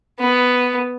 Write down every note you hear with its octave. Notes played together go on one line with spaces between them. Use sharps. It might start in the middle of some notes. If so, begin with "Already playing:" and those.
B3